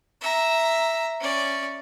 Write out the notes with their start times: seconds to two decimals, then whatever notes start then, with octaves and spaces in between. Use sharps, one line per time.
0.21 E5 A#5
1.21 C#4 D5